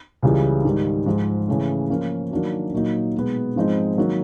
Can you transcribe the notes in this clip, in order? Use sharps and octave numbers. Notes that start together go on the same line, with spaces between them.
C#2 C#3 E3 G3
G#2 D#3 G3
G#2 F3 G#3
C#3 E3 A3 C#4
F3 A#3 C#4
D#3 F#3 A#3 D4 F#4
A#2 F#3 A#3 D#4
B2 G#3 B3
G#2 F3 G#3 C4 D#4
D#3 F#3 A#3